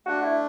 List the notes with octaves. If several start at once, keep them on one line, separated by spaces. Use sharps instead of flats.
A3 D4 F#4
E4